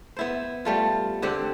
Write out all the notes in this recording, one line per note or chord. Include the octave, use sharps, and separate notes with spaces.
B3 E4 C5
G3 A3 F4
D3 C4 G4 F#5